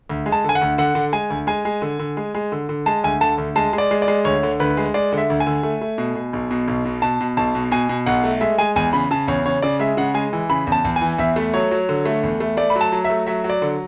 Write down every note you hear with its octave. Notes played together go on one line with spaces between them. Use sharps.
D2
G#3
A5
D3 G#5
F#5
D2
D3 F#5
D3
G#3 G#5
D2
G#3 G#5
G#3
D3
D3
G#3
G#3
D3
D3
G#3 A5
D2 G#5
D3 A5
D2
G#3 A5
G#3
D5
G#3
D5
G#3
D2 C#5
D3
D2 B4
G#3
G#3 D5
D3
E5
D2
G#5
D3
A3
A3
B2
B2
B1
B2
B1
B2
B2 A5
B2
B1 A5
B2
B2 G#5
B2
B1 F#5
A3
G#3 E5
G#3 G#5
E2 G#5
C#3 B5
C#3 A5
E2 C#5
C#3 C#5
C#3 D5
G#3 E5
C#3 F#5
G#3 G#5
E3
C#3 B5
E2
A5
E2
G#5
E3
E2 E5
A3
F#3 C#5
F#3
D3
A3
E2
A3
A3 D5
B5
F#3
A5
F#3
E5
A3
F#3 E5
F#3
D5
D3